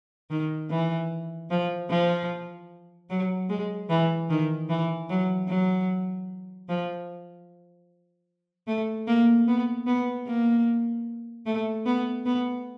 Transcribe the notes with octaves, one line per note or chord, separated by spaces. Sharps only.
D#3
E3
F3
F3
F#3
G#3
E3
D#3
E3
F#3
F#3
F3
A3
A#3
B3
B3
A#3
A3
B3
B3